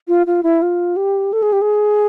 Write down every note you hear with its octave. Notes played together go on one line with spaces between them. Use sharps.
F4
F4
E4
F4
G4
A4
G#4
G4
G#4